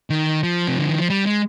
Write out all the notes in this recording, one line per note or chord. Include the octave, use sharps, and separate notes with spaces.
D#3
F3
C3
D3
D#3
F3
G3
G#3